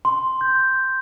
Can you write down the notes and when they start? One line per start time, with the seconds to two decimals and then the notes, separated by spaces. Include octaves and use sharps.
0.05 C6
0.41 G6